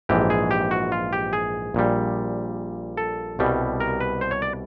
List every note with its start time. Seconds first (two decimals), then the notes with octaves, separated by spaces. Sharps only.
0.09 A#1 G#2 E3 G4
0.30 G#4
0.51 G4
0.71 F#4
0.92 F4
1.13 G4
1.33 G#4
1.74 A#1 A#2 G3
2.97 A4
3.39 C2 B2 G3
3.80 A#4
4.01 B4
4.21 C5
4.31 C#5
4.42 D5